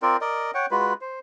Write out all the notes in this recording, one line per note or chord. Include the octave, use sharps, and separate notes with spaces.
C4 F4 A#4 D5
A#4 D5 D#5
C#5 F#5 G5
G#3 F4 F#4 B4
C5